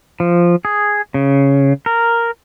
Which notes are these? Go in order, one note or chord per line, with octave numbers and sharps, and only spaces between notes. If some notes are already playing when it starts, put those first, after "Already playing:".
F3
G#4
C#3
A#4